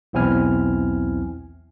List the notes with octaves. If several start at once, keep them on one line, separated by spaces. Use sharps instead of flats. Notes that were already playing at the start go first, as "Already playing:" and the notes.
B1 E2 C4 E4 G#5 F6